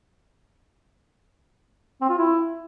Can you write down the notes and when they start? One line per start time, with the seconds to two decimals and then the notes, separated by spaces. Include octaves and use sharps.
2.01 C4
2.10 F4
2.18 E4